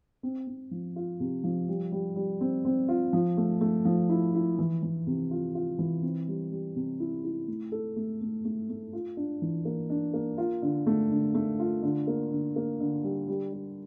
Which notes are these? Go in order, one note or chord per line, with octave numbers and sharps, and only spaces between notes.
C4
C4
F3
F4
C3
F3
G3
G3
G3
C4
C4
F4
F3
A3
A3
F3
E4
E4
E3
E3
C3
F4
F4
E3
C4
G3
G3
C3
E4
E4
A3
A4
A3
A3
A3
A3
F4
D4
E3
A#3
D4
A#3
F4
D3
A3
D3
A3
F4
D3
A#3
D3
A#3
D3
G3
G3
G3